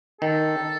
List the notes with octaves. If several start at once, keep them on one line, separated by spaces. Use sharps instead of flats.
D#3 A4